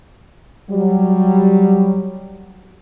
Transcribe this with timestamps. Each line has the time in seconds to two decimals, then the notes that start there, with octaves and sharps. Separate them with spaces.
0.70 F#3 G3